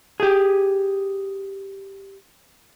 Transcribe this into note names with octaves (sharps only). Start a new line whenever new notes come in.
G4 G#4